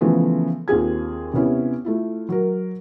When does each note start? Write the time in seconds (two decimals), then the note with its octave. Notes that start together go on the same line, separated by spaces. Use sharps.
0.01 C#3 E3 F3 A3 B3
0.68 D#2 C4 F4 G#4 G#6
1.33 C3 B3 C#4 E4
1.85 A3 E4 F4
2.29 F#3 A#4